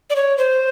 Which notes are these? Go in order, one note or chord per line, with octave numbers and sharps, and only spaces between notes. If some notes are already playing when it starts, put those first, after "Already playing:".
D5
C#5
C5